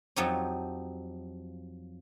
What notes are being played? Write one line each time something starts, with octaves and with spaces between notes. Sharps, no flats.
F2 F3 F#3 D#4 G4 C#5